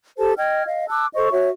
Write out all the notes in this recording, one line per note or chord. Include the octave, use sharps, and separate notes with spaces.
G4 A4 C5 A5
D#5 G5 F6 G#6
D#5 F5
A5 D6 E6 F#6
A4 C5 D#5 C#6
F#4 C#5 E5